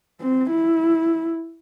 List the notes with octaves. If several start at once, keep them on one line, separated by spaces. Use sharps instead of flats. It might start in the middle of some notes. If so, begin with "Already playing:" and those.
C4
E4